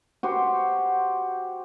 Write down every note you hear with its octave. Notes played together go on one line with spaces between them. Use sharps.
F#4 G4 C5